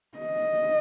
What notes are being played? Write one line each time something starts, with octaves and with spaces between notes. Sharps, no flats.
D#5